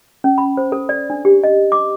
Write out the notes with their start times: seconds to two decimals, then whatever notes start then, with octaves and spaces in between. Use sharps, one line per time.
0.24 C#4
0.38 B5
0.57 C5
0.72 A4
0.89 D5
1.10 D4
1.25 G4
1.44 D#5
1.72 D6